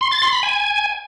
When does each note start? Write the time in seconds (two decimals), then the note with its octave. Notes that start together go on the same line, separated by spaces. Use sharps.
0.01 C6
0.11 A6
0.22 C6
0.32 B5
0.43 G#5